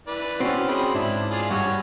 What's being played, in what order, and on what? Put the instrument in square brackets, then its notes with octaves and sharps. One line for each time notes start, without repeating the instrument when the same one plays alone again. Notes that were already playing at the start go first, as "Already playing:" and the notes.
[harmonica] E3 B4 D5
[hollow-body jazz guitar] C4 C#4 [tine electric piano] F#4 F#5
[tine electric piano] F#4 G#4 G5 [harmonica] D#5 B5 C6
[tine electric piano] G#2 [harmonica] D4 E4
[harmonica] F4 G#4 D5
[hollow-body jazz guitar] G2 [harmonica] F#4 C#5 G#5